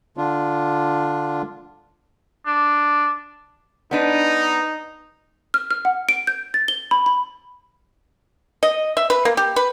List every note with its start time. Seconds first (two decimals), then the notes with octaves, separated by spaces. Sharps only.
0.17 D3 D4 F4
2.46 D4
3.91 B3 D4 D#4 B4
5.54 F6
5.71 F6
5.85 F#5
6.09 D7
6.27 G6
6.54 A6
6.68 G7
6.91 B5
7.06 B5
8.63 D#5
8.97 E5
9.10 B4
9.25 A#3
9.37 G4
9.56 B4